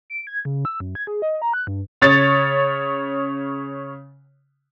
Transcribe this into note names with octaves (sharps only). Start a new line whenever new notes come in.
D7
G#6
C#3
E6
F#2
G#6
G#4
D#5
A#5
F#6
G2
C#3 C#5 A6